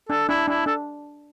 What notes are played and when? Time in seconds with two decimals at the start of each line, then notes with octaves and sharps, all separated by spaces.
0.09 D4 A4
0.29 D4 E4
0.47 D4 E4
0.66 D4 A4